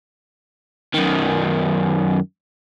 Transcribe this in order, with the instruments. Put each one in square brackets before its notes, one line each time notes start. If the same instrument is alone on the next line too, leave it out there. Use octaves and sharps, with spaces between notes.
[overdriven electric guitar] F#2 D#3